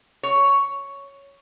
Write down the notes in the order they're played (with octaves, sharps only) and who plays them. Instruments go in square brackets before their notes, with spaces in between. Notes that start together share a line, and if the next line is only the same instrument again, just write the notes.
[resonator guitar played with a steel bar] C#5